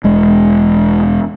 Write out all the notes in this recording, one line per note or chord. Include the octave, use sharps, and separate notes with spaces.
E1 G#3